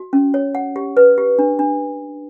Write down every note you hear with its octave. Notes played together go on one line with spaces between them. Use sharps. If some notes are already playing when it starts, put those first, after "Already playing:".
Already playing: F#4
C#4
C#5
F#5
G4
B4
G4
D4
D4